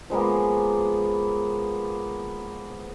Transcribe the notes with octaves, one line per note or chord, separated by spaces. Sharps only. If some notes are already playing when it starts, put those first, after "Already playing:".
F3 G#3 A#3 B3